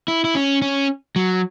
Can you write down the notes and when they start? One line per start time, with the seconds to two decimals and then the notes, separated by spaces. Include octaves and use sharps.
0.08 E4
0.24 E4
0.35 C#4
0.62 C#4
1.16 F#3